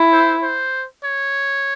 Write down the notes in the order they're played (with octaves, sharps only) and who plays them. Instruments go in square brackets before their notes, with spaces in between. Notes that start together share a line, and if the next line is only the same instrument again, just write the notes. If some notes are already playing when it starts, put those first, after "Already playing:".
Already playing: [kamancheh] E4
[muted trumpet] C5
C5
C#5